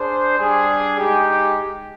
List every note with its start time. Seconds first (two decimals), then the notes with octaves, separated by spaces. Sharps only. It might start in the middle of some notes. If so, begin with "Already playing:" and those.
Already playing: D4 G#4 C5
0.37 G3 D4 G#4
0.98 G#3 D#4 G4